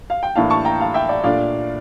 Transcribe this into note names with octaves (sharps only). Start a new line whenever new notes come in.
F5
G5
A2 E3 A#3 D4 F5 A5
A5 C#6
G5 A#5
F5 A5
E5 G5
D5 F5
A#2 A3 D4 D5 F5